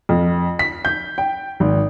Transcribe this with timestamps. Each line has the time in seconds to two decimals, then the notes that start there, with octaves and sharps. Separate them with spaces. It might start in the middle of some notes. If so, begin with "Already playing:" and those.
0.09 F2
0.59 B6
0.85 G6
1.18 G5
1.60 G#1